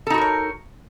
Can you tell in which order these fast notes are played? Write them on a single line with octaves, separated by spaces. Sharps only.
A4 D#4 F#4 A#4 C#5